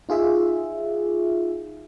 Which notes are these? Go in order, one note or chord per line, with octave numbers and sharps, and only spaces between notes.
D#4 F4 G#4 E5